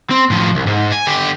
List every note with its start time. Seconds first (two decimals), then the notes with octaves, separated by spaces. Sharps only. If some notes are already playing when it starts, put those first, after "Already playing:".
0.11 C4
0.30 A2 F3
0.55 C2
0.66 G#2
0.92 G#5
1.06 D3 G4